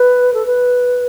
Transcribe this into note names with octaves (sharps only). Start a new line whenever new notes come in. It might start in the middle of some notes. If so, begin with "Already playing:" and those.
Already playing: B4
A4
B4